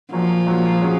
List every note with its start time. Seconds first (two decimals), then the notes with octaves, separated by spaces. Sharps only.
0.12 A#2 F3 F#3 A#3
0.46 A#2 F#3 A#3
0.80 C#3 F#3 C#4 G#4